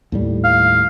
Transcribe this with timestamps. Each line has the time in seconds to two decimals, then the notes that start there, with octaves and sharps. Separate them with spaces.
0.12 D#2 A2 G3
0.44 F5